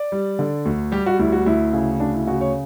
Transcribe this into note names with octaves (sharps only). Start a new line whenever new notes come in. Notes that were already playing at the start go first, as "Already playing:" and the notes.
Already playing: D5
G3
D3
D2
G3 G4
F#4
D2 E4
F#4
D2 E4
C#3
D2 D4
E4
C#3 F#4
C#5